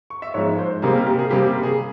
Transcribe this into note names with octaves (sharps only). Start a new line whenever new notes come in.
C#6
E5
G#2 F3 G#3 C#5
C5
C3 G3 A#3 G#4
A#4
G4
G#4
C3 G3 A#3 G4
G#4